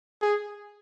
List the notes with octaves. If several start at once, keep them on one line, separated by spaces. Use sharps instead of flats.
G#4